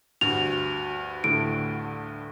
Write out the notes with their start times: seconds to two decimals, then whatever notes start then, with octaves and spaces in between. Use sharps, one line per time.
0.21 D2 G2 F#4 F7
1.24 A2 D3 D7